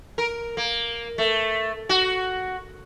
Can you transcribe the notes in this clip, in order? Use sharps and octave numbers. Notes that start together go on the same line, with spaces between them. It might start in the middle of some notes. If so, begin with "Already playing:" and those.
A#4
A#3
A3
F#4